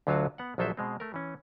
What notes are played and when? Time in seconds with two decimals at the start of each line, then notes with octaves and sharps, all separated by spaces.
0.07 D2 D3 F#3 F4 F#4 F5
0.38 B3 F#5
0.58 A#1 F3 F#3 A4 C5 E5
0.77 B2 G#3 C4
1.00 A3 A#4
1.14 E3 C#4